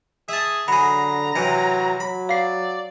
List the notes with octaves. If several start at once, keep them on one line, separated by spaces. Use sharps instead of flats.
G#4 E5 A5
D3 F#3 G#4 A#5 B5
C3 E3 F#3
F#3 B5
D5 F5 C7